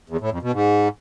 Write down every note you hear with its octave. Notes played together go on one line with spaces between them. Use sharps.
E2
A2
F2
B2
G#2